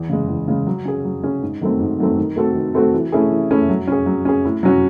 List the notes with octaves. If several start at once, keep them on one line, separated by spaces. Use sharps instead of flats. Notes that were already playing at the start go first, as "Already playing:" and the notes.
Already playing: E2
C#3 G#3
E2
C#3 G#3
F#3
C#4 G#4
F#3
C#4 G#4
G#2
D#3 F#3 A3 C4
G#2
D#3 F#3 A3 C4
D#3
A3 C4 F#4 A4
D#3
A3 C4 F#4 A4
E3
A3 C#4 E4 G#4
E3
A3 C#4 E4 G#4
F#3
C#4 G#4
F#3
C#4 G#4
A2
F#3 C#4 F#4